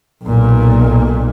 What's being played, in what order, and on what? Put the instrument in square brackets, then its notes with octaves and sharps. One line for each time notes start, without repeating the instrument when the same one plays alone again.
[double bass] B1 A#2